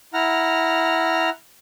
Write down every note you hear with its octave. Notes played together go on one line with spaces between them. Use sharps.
E4 F#5 A#5 F6